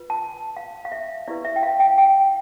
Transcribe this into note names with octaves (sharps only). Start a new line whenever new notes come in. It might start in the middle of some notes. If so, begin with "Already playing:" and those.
Already playing: F4 B4
A5
F5
F5
E5
E4 G4 B4 D5
E5
G5
F5
G5
G5